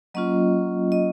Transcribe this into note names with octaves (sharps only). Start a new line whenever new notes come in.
F#3 A#3 C#4 F4 D#5
D#5